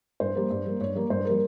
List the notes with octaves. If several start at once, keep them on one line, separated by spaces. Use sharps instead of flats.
G2 C5
G3 A#3
G2
G3 A#3
G2 C#5
G3 A#3
G2 C5
G3 A#3 A#4